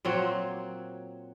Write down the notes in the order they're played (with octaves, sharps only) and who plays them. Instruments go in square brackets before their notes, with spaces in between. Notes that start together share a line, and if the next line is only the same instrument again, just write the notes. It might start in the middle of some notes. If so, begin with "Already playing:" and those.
[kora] A#2 F#3 C4 C#5